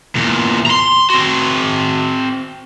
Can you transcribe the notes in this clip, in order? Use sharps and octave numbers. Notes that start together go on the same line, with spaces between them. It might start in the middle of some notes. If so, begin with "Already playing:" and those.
E2 A#2
A#5 C6
C4 F#4